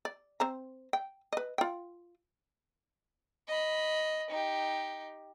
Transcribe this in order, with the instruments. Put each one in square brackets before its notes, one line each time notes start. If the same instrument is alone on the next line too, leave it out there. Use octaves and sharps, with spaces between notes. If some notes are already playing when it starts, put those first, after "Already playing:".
[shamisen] D5
C4 C5 A#5
G5
B4 D#5
F4 G5
[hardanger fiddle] D#5 B5
D#4 G4